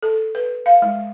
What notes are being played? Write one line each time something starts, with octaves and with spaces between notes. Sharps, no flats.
A4
B4
F5
G#3